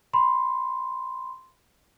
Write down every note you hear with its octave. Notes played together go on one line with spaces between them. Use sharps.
B5 C6